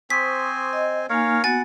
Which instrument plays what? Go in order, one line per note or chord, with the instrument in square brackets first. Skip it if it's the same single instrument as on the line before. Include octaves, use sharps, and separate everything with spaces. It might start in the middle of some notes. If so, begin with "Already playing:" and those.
[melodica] C4 C5 G#5 [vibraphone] C#6 D#6 [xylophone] B6
[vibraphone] D#5
[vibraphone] A#3 D#4 G#5 [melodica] A#4 C#5 F5
[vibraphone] B3 F#4 [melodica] F#5 [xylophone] G#5 A6